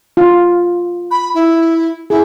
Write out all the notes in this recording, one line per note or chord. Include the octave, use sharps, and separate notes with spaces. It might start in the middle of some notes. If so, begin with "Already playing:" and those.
F4
B5
E4
E4 G#4